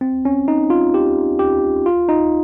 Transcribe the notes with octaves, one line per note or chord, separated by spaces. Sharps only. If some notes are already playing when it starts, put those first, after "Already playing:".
C4
C#4
D#4
F4
G4
G4
F4
D#4